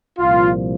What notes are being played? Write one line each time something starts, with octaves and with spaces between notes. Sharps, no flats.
C2 A#2 F3 F4